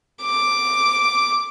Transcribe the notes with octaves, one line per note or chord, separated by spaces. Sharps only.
D6